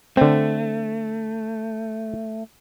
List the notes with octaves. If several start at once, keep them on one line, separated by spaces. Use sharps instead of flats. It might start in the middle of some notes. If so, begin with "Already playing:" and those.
D3 A3 C4